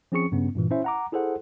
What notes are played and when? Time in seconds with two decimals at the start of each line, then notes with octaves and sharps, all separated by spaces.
0.12 F3 C4 C#4 G#4 C#6 C#7
0.32 G2 C#3 B3 C#4
0.55 G2 A#2 E3
0.71 C#4 E4 C5 E5
0.84 F#5 A#5 D6
1.12 E4 G#4 A4 C5 F#5